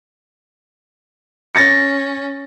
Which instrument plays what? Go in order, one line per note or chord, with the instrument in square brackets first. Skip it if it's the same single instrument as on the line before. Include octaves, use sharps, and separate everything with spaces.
[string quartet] C#4 [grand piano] A6 A#6 C#7